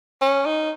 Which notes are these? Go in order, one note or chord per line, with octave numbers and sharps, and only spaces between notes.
C#4
D#4